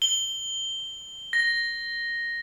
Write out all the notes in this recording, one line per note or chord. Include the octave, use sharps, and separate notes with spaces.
G7
A#6